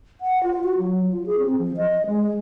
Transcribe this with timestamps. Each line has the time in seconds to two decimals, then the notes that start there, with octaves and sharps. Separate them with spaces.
0.21 F#5
0.43 F4
0.63 F#4
0.78 F#3
1.12 F4
1.26 G#4
1.39 C4
1.59 F3
1.77 D#5
2.07 G#3